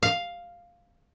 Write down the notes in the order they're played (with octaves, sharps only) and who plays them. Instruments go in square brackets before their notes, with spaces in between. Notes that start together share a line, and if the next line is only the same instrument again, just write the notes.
[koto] F5